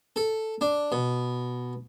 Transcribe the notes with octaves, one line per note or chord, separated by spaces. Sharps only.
A4
D4
B2